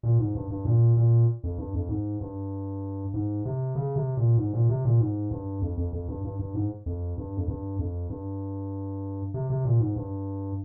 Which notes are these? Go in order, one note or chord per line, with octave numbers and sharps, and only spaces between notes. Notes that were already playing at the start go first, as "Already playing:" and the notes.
A#2
G#2
G2
G2
A#2
A#2
F2
G2
F2
G#2
G2
G#2
C3
C#3
C3
A#2
G#2
A#2
C3
A#2
G#2
G2
F2
F2
F2
G2
G2
G2
G#2
F2
G2
F2
G2
F2
G2
C3
C3
A#2
G#2
G2